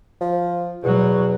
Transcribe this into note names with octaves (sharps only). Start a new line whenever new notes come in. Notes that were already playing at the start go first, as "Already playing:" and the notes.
F3
E2 B2 F#3